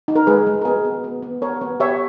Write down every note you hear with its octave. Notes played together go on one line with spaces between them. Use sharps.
D#4
A#4
G#3 G#4 B4
G#3
A#4
B3 G#4 B4
B3
B3
B3
G4 A#4 C#5
B3
G4 C#5 E5